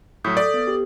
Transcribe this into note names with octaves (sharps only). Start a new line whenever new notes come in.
A2 F#3 D#6 G6 B6
A4 D5 D#6
B3
G4